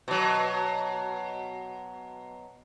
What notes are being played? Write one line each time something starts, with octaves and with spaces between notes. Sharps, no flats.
B2 F#3